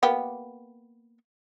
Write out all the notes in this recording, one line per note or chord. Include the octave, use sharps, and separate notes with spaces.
A#3 B3 G4